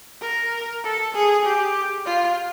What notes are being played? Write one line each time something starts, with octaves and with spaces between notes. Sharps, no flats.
A#4
A4
G#4
G4
F4